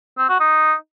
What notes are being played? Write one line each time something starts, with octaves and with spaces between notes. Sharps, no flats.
C4
F#4
D#4